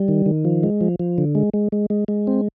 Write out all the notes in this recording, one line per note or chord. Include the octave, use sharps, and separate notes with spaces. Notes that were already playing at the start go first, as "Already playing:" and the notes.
Already playing: G3
D#3
D#3
F3
G#3
F3
F3
D3
G#3
G#3
G#3
G#3
G#3
C4